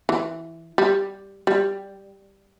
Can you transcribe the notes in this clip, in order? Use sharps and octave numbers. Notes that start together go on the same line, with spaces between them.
E3
G3
G3